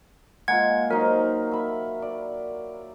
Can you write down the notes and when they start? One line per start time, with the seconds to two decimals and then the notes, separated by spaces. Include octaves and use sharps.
0.48 G#3 A#3 F4 F#5 G#6
0.91 F#3 D#4 A#4 C5
1.51 E5 B5
2.02 D5